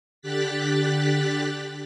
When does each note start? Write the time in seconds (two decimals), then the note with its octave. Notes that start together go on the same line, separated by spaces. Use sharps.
0.22 D3 G4 F#6 A6 B6